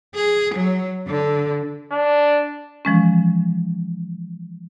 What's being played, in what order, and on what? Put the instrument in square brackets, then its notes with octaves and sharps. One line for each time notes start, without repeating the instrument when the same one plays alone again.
[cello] G#4
F#3
D3
[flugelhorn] D4
[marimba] E3 F3 G#3 C#4